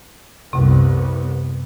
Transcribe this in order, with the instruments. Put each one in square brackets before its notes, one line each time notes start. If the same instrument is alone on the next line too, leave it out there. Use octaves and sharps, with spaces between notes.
[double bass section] C2 B3 [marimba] F#2 C3